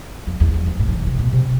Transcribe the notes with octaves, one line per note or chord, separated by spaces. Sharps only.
F2
E2
F2
F2
A2
D3
E3
C3
B2
C3